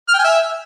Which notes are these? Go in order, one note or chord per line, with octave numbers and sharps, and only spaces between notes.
F6
G5
G#5
E5